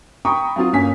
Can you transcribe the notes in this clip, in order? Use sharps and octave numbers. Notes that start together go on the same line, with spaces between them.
G5 A#5 B5 C#6 D#6
F#3 C4 F4
G1 A#3 C#4 G#5 B6